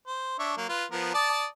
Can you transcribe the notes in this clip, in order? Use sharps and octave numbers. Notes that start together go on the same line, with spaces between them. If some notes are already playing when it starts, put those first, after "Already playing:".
C5
D4 C#5 E5
F#3 A#3
F4 B4
F3 B3 A#4
D5 A5 D#6